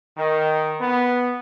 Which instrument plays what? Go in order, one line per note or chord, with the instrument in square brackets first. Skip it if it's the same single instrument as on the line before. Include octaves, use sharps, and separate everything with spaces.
[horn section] D#3
B3